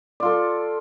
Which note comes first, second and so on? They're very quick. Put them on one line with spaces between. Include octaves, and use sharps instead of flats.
D5 F4 A4